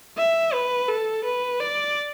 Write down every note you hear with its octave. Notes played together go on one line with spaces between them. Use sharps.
E5
B4
A4
B4
D5